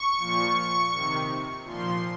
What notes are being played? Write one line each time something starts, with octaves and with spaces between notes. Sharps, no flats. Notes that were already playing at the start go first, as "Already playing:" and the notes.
Already playing: C#6
A#2 F3
C3 D#3
A#2 F3 C6